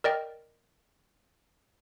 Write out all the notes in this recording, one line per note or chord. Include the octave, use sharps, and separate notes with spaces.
A#4 D5 D#5 G5